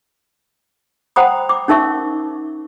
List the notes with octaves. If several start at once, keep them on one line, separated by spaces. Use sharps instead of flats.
C5 F#5 G5 A#5 B5 D#6
D6
C#4 D#4 A#4 E5 C#6